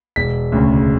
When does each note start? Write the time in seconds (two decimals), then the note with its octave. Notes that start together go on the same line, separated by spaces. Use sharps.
0.16 E1 B6
0.52 D2 C#3